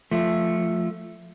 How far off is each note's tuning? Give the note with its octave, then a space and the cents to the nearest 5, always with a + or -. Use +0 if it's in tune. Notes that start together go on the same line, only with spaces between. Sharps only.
F3 +0 A3 +0